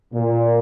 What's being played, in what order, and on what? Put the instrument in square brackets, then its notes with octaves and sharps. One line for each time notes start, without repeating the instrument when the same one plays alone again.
[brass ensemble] A#2